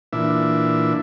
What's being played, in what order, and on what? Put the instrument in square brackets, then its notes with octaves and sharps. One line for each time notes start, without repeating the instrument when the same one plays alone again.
[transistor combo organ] A#2 E3 D4 E5